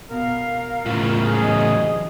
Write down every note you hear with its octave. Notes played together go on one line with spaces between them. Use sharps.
B2 A#4 F5
A2 C#3 E3 F4
A#3 G#4
E3 F#3 D#5